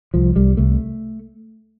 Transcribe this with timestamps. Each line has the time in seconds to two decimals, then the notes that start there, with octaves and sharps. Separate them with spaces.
0.14 C2 F3
0.36 C2 G3
0.57 C2 A3